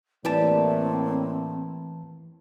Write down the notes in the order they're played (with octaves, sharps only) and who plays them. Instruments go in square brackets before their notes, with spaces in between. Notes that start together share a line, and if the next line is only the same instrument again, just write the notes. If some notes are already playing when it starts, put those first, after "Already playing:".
[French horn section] A2 A#3 [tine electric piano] E3 A5 [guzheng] G3 G4 [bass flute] C4